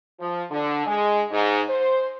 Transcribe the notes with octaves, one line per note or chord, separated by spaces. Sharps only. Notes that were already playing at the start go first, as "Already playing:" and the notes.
F3
D3
G#3
G#2
C5